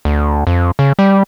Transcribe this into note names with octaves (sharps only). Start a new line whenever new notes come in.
D2
F2
C#3
G3